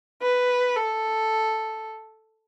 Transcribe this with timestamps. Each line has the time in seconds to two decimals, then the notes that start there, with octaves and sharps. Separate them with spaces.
0.22 B4
0.76 A4